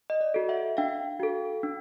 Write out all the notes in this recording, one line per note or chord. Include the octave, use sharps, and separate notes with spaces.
D#5
D5
F#4 A4
E5 F#5
D4 F5 G5
F#4 A4
D4